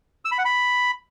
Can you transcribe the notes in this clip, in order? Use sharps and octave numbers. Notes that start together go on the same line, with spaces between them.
E6
B5
F#5
B5